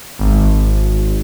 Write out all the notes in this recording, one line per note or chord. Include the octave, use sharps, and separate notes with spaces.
G#1